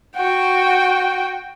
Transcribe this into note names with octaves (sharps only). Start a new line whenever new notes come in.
F#4 G5